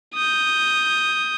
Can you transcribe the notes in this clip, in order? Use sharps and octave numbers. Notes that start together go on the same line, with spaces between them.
D#6 G6